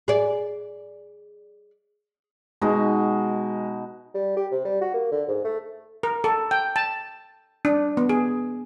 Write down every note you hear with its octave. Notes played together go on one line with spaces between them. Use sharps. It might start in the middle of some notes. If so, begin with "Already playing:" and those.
G#4 D5
B2 G#3 D#4 F#4
G3
G4
C3
G3
F#4
A#3
D3
G#2
A3
A#4
A4
G5
A5
D4
B3
G#4